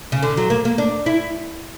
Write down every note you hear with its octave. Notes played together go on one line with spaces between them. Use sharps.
C#3
D3
F#3
A#3
A#3
D4
E4